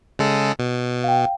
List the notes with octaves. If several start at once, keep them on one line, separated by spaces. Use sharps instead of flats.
C#3 G#3 A4
B2
F5 G5